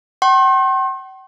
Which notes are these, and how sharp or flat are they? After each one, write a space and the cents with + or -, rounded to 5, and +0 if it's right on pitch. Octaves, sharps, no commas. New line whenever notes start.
G5 -45 C6 +40